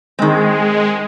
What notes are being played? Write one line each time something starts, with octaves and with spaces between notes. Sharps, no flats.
D#3 G#3 C4